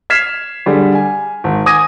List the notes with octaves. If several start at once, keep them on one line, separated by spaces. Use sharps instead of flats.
F6 G#6 B6 C7 E7
D3 G3 G#4
G#5
G#1
G#5 D6 D#6 G#6 A#6 D#7